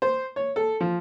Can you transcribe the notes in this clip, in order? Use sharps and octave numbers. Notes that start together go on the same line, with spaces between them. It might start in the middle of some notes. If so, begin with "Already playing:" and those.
C5
C#5
A4
F3